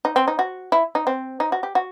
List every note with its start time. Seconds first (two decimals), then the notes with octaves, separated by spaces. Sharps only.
0.05 D#4
0.16 C4
0.28 D#4
0.39 F#4
0.72 E4
0.95 D#4
1.07 C4
1.40 D#4
1.52 F#4
1.63 G4
1.75 F#4